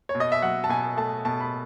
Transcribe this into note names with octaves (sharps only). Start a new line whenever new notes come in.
C#5
B2
D#5
E5
F#3 F#5
A5
B2 G#5
A3 A5
B2 A5
B5